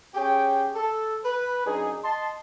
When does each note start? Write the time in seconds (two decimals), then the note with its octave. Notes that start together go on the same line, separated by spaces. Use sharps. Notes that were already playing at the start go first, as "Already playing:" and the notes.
0.15 C#4 G4 G#4 C#5 G5
0.75 A4
1.25 B4
1.66 F#2 D4 D#4 G#4
2.03 D#5 A5 C6